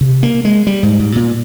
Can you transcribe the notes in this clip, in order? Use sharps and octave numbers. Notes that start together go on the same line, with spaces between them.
C3
A#3
G#3
G3
G#2
G#2
A#2